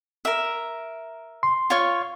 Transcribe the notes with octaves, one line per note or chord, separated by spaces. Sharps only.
A#4 E5
C6
F4 C#5 C#6